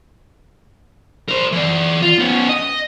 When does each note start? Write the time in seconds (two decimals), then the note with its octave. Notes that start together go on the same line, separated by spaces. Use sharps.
1.29 A#4 C5
1.52 E3 D5
2.02 F4
2.19 B3 C#4
2.49 D#5